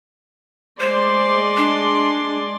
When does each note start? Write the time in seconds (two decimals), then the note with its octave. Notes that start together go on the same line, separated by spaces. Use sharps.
0.80 G#3 C5 D5 C6
1.57 D4